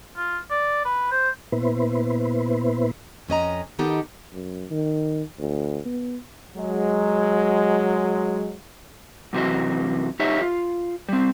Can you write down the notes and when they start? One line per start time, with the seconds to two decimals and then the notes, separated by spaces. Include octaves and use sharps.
0.17 F4
0.51 D5
0.85 B4
1.11 C5
1.52 A#2 B3 E4 B4 C5
3.28 F2 C#4 D#5 A#5
3.79 D#3 B3 D#4 G4 A4
4.33 F#2
4.71 D#3
5.39 D2
5.86 B3
6.56 F#3 G#3
9.33 F#2 C3 E3 F#4 D#5
10.20 D#4 G4 C#5 D#5 E5
10.42 F4
11.08 G3 C4